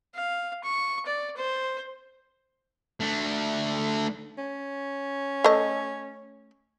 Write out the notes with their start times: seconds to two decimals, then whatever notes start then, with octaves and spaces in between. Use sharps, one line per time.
0.14 F5
0.64 C#6
1.06 D5
1.36 C5
3.00 A3 D4
4.38 C#4
5.44 A3 D#5